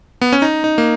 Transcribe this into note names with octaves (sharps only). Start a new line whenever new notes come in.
B3
C#4
D#4
D#4
A#3